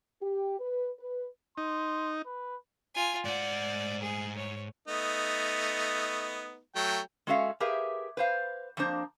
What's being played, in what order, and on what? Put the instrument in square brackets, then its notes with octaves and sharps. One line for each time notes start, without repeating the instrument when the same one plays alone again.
[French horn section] G4
B4
B4
[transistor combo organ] D#4 [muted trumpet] C6
[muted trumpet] B4
[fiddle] F4 G#5
[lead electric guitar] G#2 F#5 [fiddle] D5
[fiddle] G#4
C#5
[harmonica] A3 B3 D#4
F#3 A3 G5
[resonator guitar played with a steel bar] G#3 C#4 F#4 A4 E5 F5
G4 G#4 A#4 B4 E5 F5
B4 C5 F5
F2 F3 A#3 D4 C5 A#5